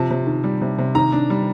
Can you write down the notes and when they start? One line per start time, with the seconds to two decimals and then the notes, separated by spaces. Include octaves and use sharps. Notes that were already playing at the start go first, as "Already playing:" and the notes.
Already playing: C3 F3 A5
0.11 C3
0.27 D#3
0.44 G3
0.61 C3
0.78 C3
0.95 D#3 A#5
1.12 D4
1.30 G3